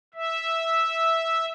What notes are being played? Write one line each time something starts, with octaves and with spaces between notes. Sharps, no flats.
E5